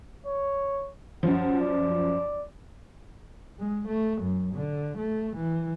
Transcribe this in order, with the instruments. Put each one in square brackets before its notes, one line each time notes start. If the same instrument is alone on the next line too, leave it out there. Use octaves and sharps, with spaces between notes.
[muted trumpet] C#5
[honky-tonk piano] F#2 F3 [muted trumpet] F#5
[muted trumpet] D5
[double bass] G#3
A3
F#2
D3
A3
E3